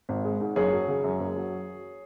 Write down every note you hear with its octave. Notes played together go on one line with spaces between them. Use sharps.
G#1
G#3
G#2
F#1 G#4 C#5
F#3
C#3
F#2
F#1
F#3